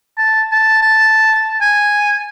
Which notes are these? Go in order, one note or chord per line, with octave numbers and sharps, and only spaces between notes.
A5
A5
A5
G#5